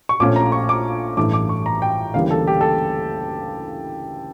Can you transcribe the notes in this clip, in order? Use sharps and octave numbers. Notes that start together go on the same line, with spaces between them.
C#6
A#1 A#2 A3 C#4 D6
A#5
C#6
D6
A1 G2 E3 A3 D6
D6
C#6
A#5
G5
D2 C#3 E3 G3 A#3 F5
A4
G4
A4